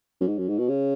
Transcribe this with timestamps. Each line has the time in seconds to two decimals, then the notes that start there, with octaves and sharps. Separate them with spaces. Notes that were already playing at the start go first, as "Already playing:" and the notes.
0.21 F#2
0.28 G#2
0.38 F#2
0.48 G#2
0.59 B2
0.68 C#3